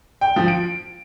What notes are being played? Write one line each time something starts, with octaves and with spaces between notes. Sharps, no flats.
G5
F3
D7